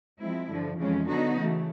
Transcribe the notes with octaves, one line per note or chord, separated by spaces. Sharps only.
F3 G#3 C4 E4
G2 D3 F3
F2 C#3 E3 G#3 C#4
D3 F#3 B3 D#4 F#4
C#3 E3 A3